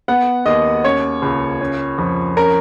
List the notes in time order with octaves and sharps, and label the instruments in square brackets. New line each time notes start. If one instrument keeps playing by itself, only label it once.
[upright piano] B3 F#5
D#2 D#5
C#4 C#5
C#2
C#4
F2
C#4 A#4